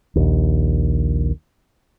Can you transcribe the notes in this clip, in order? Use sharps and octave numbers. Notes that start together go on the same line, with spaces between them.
A#1 D#2